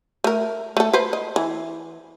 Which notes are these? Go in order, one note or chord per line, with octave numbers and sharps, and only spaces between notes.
A3 A#4
A3 A4
B4 C5
D#5
E3